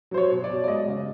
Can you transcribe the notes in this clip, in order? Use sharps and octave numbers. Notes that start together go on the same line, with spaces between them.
F#3 C5
C#5
B2
D5
B2
D5
G#3 D#5
C#3